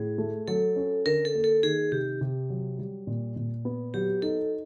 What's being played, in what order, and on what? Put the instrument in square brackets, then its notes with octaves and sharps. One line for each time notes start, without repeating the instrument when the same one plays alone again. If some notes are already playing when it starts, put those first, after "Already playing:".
Already playing: [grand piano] A2 [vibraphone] G#4
[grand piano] A3
[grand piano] F#3 [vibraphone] A4
[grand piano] C#4
[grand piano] D3 [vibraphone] A#4
[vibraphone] A4
[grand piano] A#3
[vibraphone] A4
[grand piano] D#3 [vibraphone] G#4
[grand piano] C3 [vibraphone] G4
[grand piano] C3
F#3
G3
A#2
A#2
B3
[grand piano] F#3 [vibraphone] G4
[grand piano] D#4 [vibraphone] A4